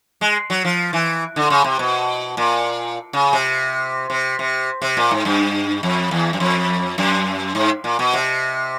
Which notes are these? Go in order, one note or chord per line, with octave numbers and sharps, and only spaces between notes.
G#3
F#3
F3
E3
D3
C#3
C3
B2
A#2
C#3
C3
C3
C3
C3
A#2
G#2
G2
F2
E2
F#2
F2
F#2
G#2
A#2
B2
C3